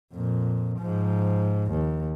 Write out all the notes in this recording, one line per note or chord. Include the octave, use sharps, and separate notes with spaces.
F2 A#2
G#2 F3
D#2